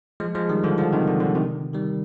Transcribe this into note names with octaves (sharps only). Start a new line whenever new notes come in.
F3 G#3
F3 G#3
D#3 G3
D3 F3
D3 F3
C3 D#3
D3
D3
C3 D#3
D#3 G3